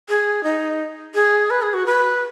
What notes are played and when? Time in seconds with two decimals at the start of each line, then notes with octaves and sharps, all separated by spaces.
0.09 G#4
0.44 D#4
1.15 G#4
1.50 B4
1.62 G#4
1.74 F#4
1.86 B4